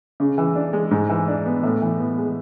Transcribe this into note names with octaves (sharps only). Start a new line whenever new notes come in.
C#3
E3
D4
G#3
G#2
E3
D4
B3
A2
E3
B3
G#3